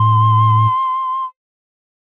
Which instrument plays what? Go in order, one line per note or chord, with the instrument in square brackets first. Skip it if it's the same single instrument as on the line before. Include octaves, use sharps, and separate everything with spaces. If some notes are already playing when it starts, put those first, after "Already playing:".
Already playing: [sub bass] A2 [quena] C6